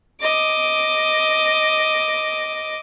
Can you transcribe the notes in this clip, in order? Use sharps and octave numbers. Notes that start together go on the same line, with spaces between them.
D#5 D6